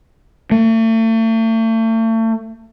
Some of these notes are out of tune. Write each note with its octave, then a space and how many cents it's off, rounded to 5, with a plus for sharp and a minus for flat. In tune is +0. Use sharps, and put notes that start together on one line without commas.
A3 +40